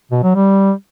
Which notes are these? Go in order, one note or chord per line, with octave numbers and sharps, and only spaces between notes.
B2
F#3
G3